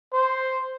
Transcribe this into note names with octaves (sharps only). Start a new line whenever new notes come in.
C5